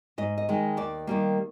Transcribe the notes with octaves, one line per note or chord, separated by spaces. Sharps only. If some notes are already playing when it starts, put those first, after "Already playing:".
G#2 D#5
D#5
D#3 G#3
D#2 D5
D#3 G3 A#3